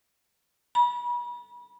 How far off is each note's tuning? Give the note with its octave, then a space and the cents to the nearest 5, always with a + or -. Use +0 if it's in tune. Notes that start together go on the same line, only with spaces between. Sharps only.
B5 -40